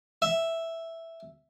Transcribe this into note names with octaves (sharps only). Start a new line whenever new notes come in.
E5